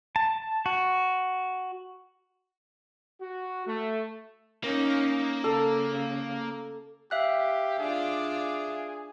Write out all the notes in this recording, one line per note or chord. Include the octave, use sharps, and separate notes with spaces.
A5
F#4
F#4
A3
A#3 C#4 D#4
C#3 A4
G4 E5 F5 F#6
D4 F4 G#4 D5